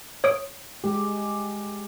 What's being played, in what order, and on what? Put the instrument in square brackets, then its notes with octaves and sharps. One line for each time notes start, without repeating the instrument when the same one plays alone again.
[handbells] C#5 D#6 D7
[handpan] G#3 G4